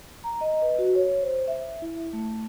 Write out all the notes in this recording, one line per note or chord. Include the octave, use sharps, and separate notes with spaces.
A#5
D#5
B4
F#4
C#5
C5
E5
E4
A3